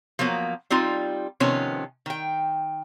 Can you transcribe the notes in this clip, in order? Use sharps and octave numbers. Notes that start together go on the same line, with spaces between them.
F3 F#3 A#3 B3
G3 C4 D#4 F4
C3 D#3 F3 B3 C#4
D#3 G5